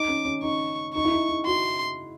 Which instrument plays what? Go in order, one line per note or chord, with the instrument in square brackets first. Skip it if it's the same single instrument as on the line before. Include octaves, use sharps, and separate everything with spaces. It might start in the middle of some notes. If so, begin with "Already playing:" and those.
Already playing: [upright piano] D#4 [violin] D6
[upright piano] C#4
C#4
[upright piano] D#4 [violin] C#6
[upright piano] D#4 [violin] C#6
[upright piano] E4
D#4
D#4
[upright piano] F#4 [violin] C6